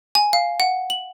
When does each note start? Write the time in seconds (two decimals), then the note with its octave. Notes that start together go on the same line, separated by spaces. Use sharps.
0.15 G#5
0.33 F5
0.60 F#5
0.90 F#7